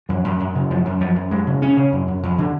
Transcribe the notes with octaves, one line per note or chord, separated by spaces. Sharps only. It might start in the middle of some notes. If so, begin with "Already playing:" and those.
F#2 F3
F#2
F#2
C#3
F#2 F3
F#2
F#2 F3
F#2
F#2 G#3
C#3
C#3 C#4
C#3
F#2
F#2
F2
D3